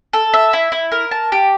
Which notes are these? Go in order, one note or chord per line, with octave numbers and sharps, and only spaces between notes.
A4
E5
E4
E4
A#4
A5
G4